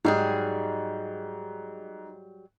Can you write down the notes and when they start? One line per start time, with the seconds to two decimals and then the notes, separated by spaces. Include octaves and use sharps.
0.05 G#2 F#3 G3 G#4